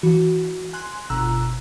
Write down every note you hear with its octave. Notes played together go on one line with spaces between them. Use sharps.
E3 F#4
G#5 C6 F#6
G1 B2 A#5 E6 F#6